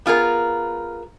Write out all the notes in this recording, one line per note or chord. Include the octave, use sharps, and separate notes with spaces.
B3 F4 G#4 A#4